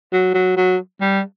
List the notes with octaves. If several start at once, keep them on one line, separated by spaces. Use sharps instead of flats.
F#3
F#3
F#3
G3